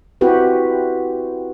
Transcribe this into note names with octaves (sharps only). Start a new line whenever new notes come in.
C4 E4 F#4 G4 B4